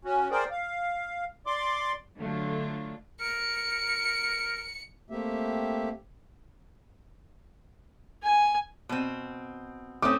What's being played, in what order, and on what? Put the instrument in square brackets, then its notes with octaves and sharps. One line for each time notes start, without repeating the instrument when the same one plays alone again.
[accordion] C#4 F#4
G#4 A#4 C5 D5 G5
F5
D5 C6 D6
[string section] D3 F#3 A3 D4 F4
[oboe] A#4 [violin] C#7
[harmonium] A3 A#3 C4 G4 E5
[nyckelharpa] G#5
[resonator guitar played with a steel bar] B2 C4
[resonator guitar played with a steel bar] A3 C4 C#4 [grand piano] D6 D#6